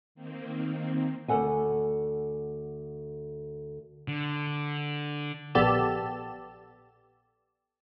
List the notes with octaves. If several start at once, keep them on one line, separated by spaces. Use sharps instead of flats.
D#3 A#3 C4
D2 G2 A4 F#5 G#5
D3
A#1 B3 G4 A4 D5 E7